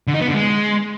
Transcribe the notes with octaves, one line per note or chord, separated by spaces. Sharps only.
D3
D#4
B3
D3
G#3